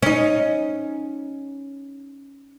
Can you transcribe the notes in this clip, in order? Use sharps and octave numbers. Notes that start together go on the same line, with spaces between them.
C#4 D#4